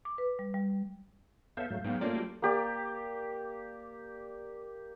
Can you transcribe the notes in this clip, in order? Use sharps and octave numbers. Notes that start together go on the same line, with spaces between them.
D6
B4
G3
G3
B3 A4 E5 F5 G6
G#2 F#3 A3
G#2 F#3 B3 F5 G5
A3 A#3 C#4 F4 D5
F#3 G3
A#3 G4 D5